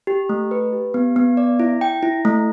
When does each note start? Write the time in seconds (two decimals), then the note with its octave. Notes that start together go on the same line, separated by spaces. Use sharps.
0.07 G4
0.29 A3
0.51 B4
0.72 G4
0.94 B3
1.16 B3
1.37 D5
1.60 E4
1.81 G5
2.03 E4
2.25 A3